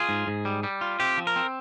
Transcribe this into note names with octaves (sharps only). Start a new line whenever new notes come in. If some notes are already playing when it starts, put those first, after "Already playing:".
Already playing: F4 G#4
G#2
G#2
G3
G3
F4
C4 G4
F3
A#4
C4